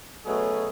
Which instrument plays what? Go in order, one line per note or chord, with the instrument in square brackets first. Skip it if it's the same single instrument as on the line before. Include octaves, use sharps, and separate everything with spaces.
[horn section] B2 F#3 A3 C#4 G#4